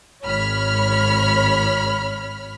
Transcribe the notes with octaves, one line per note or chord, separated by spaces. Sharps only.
G#1 C#5 B5 F6